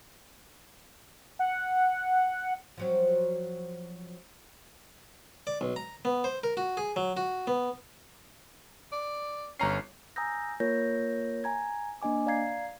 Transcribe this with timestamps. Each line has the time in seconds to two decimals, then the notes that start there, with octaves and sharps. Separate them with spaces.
1.39 F#5
2.78 F3 F#3 C4
5.47 D5
5.61 B1
5.76 A#5
6.05 B3
6.24 C5
6.43 A#4
6.57 F#4
6.77 G#4
6.96 F#3
7.17 F#4
7.47 B3
8.92 D5
9.60 G1 C#4 A#5 C7
10.16 G#5 A#5 D#6 E6 G6 A#6
10.60 A#3 F4 A#4 C#5 G6 A#6
11.44 G#5 A#5 G#6
12.02 A#3 D4 D#5 G#5 D6
12.26 D5 F5 A#5 G#6 C7